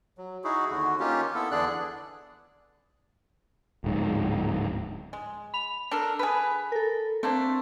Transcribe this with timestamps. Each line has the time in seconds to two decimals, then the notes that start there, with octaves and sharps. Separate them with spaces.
0.18 F#3
0.44 D#4 E4 F#4 G#4
0.71 D#2 D3 F#4
1.00 A#3 C#4 D#4 F4 G4
1.35 B3 E4 A4
1.51 E2 D3 D4 G#4 D5 F#6
3.84 D1 G#2
5.13 G#3
5.54 B5 F7
5.91 D4 A4 A#4
6.19 G#4 B4 B5
6.72 A4 A#4
7.23 A3 A#3 C4 D4 C5